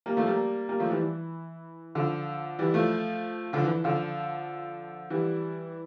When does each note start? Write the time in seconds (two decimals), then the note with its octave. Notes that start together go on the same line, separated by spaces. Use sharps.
0.06 G3 A#3
0.17 F3 A3
0.26 G3 A#3
0.69 G3 A#3
0.79 F3 A3
0.90 E3 G3
1.01 E3
1.95 D3 F3
2.59 E3 G3
2.74 F3 A3
3.53 D3 F3
3.64 E3
3.84 D3 F3
5.10 E3 G3